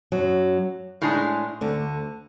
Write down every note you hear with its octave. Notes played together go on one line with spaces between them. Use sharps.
F#2 F#3
A2 G#3 D4 G#4
D2 D3